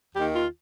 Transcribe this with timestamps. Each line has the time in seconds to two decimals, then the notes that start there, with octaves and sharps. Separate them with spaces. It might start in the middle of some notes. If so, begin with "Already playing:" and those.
0.15 D#2 D#3 G4
0.34 F4